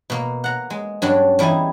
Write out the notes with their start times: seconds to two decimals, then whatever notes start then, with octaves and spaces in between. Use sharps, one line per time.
0.10 B2 A#3
0.44 F#5 A#5
0.70 G#3
1.02 G2 F#3 C#4 D4
1.39 E2 G3 D#4 E4 G#5